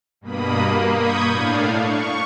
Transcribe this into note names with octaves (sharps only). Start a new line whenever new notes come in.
G2 B2 A#3 B5 D#6
A#3
B5 C#6 D#6 G6 G#6
A2 D4 F5
C#6